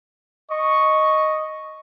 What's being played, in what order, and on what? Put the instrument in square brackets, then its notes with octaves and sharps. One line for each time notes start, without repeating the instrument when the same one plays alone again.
[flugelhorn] D#5 [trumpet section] C#6